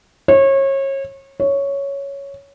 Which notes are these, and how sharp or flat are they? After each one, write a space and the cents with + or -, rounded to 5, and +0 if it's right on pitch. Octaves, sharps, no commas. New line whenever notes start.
C#5 -30
C#5 +5